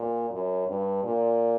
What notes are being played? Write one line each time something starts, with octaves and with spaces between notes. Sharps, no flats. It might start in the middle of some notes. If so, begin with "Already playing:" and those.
Already playing: A#2
F#2
G2
A#2